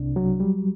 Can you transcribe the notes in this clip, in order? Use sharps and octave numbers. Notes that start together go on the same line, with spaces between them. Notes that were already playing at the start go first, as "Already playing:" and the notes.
Already playing: C2 C3 D4
F#3
G3